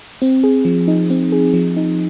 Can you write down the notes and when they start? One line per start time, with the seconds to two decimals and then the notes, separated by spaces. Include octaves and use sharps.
0.22 C4
0.44 G#4
0.65 F3
0.88 D#4
1.10 C4
1.32 G#4
1.54 F3
1.77 D#4